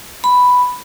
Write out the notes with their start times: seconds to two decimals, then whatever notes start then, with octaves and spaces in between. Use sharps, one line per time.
0.24 B5